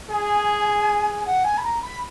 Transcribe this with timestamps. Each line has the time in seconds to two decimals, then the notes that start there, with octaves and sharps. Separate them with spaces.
0.10 G#4 G#5
1.26 F#5
1.44 G#5
1.58 B5
1.63 A#5
1.82 B5